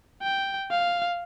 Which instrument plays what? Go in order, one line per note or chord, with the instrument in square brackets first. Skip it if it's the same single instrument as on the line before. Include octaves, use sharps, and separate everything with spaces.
[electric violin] G5
F5